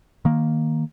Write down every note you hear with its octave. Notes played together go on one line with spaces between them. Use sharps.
D#3 A#3